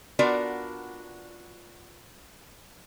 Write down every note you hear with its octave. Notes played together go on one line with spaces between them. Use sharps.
B3 D4 F4 F#4 A#4 D5